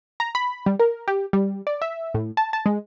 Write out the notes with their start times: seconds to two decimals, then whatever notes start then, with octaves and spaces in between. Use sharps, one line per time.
0.20 A#5
0.35 B5
0.66 G3
0.80 A#4
1.08 G4
1.33 G3
1.67 D5
1.82 E5
2.14 A2
2.37 A5
2.53 A5
2.66 G#3